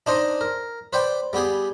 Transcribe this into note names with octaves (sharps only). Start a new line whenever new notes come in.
D4 D#4 C5 D#5
A#4
B4 C5 D5 G5
G3 B3 G4 G#4